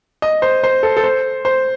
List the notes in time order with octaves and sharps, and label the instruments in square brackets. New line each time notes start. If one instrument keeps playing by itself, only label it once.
[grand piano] D#5
C5
C5
A4
A4
C5
C5